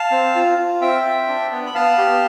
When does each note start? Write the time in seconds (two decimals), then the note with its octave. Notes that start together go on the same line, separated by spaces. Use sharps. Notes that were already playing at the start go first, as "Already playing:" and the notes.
Already playing: F5 A5
0.11 C4
0.35 F4
0.58 F4
0.81 C4 E5 G5
1.05 C4
1.28 D4
1.51 B3
1.66 B5
1.74 B3 F5 A5
1.98 G4